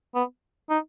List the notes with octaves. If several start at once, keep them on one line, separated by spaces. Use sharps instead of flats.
B3
D#4